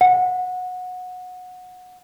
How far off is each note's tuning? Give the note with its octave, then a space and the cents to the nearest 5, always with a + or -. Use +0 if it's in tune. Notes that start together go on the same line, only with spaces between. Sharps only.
F#5 -20